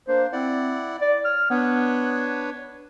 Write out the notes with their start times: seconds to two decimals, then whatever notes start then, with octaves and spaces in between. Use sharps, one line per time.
0.08 A#3 D4 C5
0.33 C4 E4 D5 F#5
1.01 D5
1.25 C#5 F6
1.50 B3 D4 B4 C#5